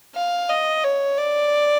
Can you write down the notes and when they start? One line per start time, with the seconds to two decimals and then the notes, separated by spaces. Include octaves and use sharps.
0.15 F5
0.49 D#5
0.84 C#5
1.18 D5